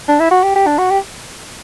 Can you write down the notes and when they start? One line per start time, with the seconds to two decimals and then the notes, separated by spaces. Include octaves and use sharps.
0.08 D4
0.20 E4
0.31 F#4
0.43 G4
0.56 G4
0.67 D4
0.78 F#4
0.91 G4